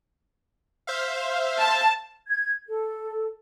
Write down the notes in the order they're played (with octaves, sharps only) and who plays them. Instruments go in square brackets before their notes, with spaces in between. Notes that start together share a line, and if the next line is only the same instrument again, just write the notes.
[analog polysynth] C5 E5 F5
[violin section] A5
[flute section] G#6
A4